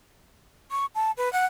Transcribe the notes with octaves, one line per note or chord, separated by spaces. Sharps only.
C#6
A5
B4
F#5